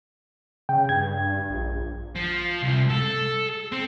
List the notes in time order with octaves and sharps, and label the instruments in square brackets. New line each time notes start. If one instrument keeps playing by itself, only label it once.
[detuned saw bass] C#3 [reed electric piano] G5
[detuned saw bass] G2 [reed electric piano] G#6
[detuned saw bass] A#1
[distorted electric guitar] F3
C2
A4
C4